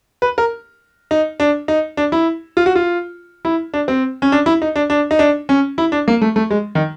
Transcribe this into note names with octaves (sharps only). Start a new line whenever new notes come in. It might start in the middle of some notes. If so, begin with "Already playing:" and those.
B4
A#4
D#4
D4
D#4
D4
E4
F4
F#4
F4
E4
D4
C4
C#4
D4
E4
D#4
D4
D4
D#4
D4
C#4
E4
D4
A#3
A3
A3
G#3
D#3